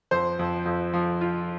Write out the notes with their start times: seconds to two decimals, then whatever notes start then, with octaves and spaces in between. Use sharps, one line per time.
0.11 F2 C5
0.39 F2
0.66 F2
0.93 F3
1.21 F4